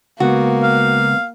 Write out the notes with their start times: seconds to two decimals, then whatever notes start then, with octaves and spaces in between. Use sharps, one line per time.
0.20 C#2 A#3 B3 F#4
0.63 F5